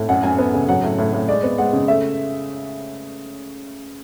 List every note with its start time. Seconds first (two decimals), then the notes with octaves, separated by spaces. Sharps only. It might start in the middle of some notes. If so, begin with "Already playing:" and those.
Already playing: A2
0.09 F#2 F#5
0.23 F#2 G#5
0.38 B3
0.54 C#3
0.69 F#3 F#5
0.83 A2
0.99 A2
1.13 A2
1.28 G#3 D5
1.43 B3
1.58 G#3 F#5
1.73 C#3
1.88 A3 E5